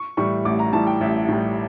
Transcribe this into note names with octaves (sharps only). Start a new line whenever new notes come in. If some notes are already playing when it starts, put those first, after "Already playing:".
Already playing: C#6
A2 E3 G3 C#6
A1 D6
A#5
A2 E3 G3 A5
G5
A1 E5
A2 E3 G3